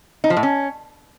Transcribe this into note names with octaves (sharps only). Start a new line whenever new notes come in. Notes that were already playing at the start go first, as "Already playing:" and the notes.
D#4
F3
A2
C#4